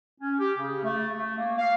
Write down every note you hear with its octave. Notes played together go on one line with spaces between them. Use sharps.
C#4
G4
C#3
A3
A3
A#3
F5